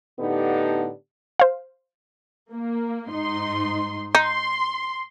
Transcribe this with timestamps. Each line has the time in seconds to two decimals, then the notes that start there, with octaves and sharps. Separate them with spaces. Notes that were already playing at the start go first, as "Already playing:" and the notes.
0.20 A2 D3 B3 D4 D#4 G4
1.40 C5 F5
2.52 A#3
3.10 G#2 D#4 C6
4.15 D#4 C6